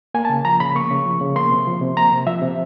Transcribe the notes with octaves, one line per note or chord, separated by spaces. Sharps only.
A#3 G#5
A5
C#3
F3 A#5
C#3 B5
A#3 C#6
C#3
F3
C#3
A#3 C6
C3
F3
C3
A#3 A#5
C3
F3 E5
C3